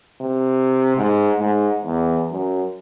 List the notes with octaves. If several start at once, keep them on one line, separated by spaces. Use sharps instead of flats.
C3
G#2
G#2
E2
F#2